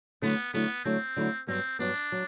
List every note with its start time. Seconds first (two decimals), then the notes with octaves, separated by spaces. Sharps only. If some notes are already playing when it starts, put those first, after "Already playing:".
0.22 D3 F#3 A3 B3 E4
0.53 D3 F#3 A3 B3 E4
0.85 D3 F#3 A3 C4 E4
1.16 D3 F#3 A3 E4
1.47 G2 F#3 B3 C4
1.79 G2 F#3 B3 D4
2.12 F#3